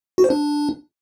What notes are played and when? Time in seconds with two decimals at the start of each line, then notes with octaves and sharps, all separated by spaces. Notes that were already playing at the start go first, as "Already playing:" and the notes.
0.18 F#4
0.24 C5
0.30 D4